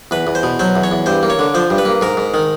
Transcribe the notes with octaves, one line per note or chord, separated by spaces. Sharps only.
E2 B4
E2
C5
B2
F#3 C5
E2
C#5
E2
G2 C5
A#3
C#5
D3
F3 C5
G2
B4
A#3
G#2 A#4
G#2
D#3